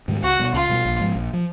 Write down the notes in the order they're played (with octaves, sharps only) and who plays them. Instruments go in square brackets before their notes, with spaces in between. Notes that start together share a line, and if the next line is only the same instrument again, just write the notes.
[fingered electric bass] G#2 D#3 G3
[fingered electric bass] C#2 [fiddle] F#4
[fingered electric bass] B2 G3
[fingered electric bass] C#2 [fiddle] F4
[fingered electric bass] B2 G3
A#1
G#2 F3
A#1
F3